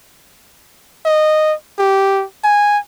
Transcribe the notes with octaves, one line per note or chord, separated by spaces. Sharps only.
D#5
G4
G#5